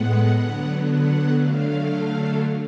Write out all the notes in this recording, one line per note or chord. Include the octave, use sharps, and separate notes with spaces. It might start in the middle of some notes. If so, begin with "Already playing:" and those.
Already playing: A2 G#3 B3 F#5
D3 F#3 B3
F#5
D3 F#3 A3 F5